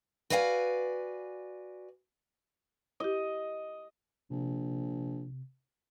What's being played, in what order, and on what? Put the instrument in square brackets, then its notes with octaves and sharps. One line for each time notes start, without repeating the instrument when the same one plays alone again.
[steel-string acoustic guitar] F#4 B4 D5 F5 G5 G#5
[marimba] E4 G4 [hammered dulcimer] D#5
[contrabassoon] A#1 [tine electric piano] C3